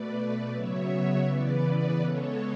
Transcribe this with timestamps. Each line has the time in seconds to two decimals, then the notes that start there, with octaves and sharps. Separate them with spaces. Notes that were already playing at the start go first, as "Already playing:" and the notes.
Already playing: B2 A3 B4 D5
0.51 C#3 F#3 B3 C#5 E5
1.24 C#3 E3 B3 B4 D5
1.99 C#3 G#3 B3 A4 C#5